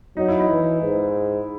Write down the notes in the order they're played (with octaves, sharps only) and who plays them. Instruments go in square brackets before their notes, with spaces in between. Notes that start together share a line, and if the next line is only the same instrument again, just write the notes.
[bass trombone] F#3 [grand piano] D#4
[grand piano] E4
D#4
[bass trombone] E3
G#2